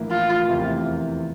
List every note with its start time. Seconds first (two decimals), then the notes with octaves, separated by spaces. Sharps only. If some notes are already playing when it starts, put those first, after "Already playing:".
Already playing: A#1 A2 E3 A#3 E4
0.11 F4
0.48 F1 E2 C3 E3 A#3